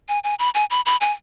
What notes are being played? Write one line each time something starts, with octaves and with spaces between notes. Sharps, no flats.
G#5
G#5
B5
G#5
B5
B5
G#5